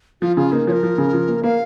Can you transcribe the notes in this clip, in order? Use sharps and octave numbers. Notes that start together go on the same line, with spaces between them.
F3 F4
C#3 F4
A#3 D#4
F3 C#5
A#4
F3
C#3
F3
A#3
A#3 F5